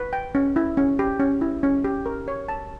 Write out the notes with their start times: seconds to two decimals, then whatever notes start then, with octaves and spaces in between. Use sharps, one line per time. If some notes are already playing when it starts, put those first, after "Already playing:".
Already playing: B4
0.13 G5
0.35 C#4
0.56 E4
0.77 C#4
0.99 G4
1.20 C#4
1.41 E4
1.63 C#4
1.84 G4
2.06 A#4
2.28 C#5
2.49 A5